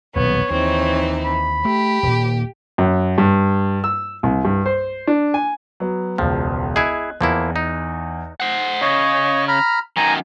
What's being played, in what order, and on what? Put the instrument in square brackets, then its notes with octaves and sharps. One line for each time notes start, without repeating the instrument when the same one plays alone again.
[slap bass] D#1 B1 E2 [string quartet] B3 [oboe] C#5
[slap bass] D#2 [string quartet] E3 C4 D#4
[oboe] B5
[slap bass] A3 [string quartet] G4
[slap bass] D#1 A#2
[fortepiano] F#2
G2
E6
C2
G2
C5
D4
G#5
[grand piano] F#3 B3
[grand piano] E1 C#2 [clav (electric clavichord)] F3
[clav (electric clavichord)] E4 G#4 [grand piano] D#5 F#6 G#6
[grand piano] E2 [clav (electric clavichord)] F3 A#3 E4
[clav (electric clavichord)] D#4
[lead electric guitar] C5 F#5
[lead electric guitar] C#3 [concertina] C#5 D#5
[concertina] A#5 B5 F6
[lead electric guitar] F#2 D#3 [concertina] G#5 A#5